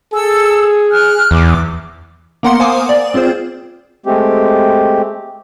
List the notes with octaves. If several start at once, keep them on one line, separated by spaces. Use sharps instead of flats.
G#4 A4 E6
F6 F#6
E2 D6
A#3 B3 A#4 F#5 C6 C#7
C5 F5 G#5 D6 D#6
D5
C4 F4 G#4 C5
G#3 A3 C4 G4